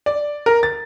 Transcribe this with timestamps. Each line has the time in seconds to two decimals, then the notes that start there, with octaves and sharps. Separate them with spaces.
0.06 D5
0.46 A#4
0.63 A6